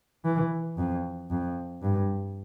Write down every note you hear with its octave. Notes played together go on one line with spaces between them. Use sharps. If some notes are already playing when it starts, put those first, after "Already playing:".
E3
F2
F2
G2